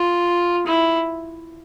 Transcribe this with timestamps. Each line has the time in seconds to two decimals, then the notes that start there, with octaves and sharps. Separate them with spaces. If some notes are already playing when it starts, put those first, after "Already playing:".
Already playing: F4
0.66 E4